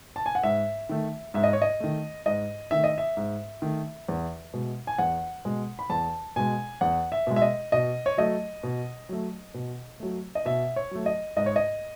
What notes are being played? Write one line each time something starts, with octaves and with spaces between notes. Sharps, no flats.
A5
G#5
F#5
G#2 E5
D#3 A3
G#2 E5
D#5
C#5
D#5
D#3 A3
G#2 D#5
D#3 A3 E5
D#5
E5
G#2
D#3 A3
E2
B2 G#3
G#5
E2 F#5
B2 G#3
B5
E2 A5
B2 G#3 G#5
E2 F#5
E5
B2 G#3
E5
D#5
B2 D#5
C#5
F#3 A3 D#5
B2
F#3 A3
B2
F#3 A3
D#5
B2 E5
C#5
F#3 A3
D#5
G#2 D#5
C#5
D#5